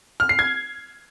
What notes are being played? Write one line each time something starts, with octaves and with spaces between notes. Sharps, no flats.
F6
C7
G#6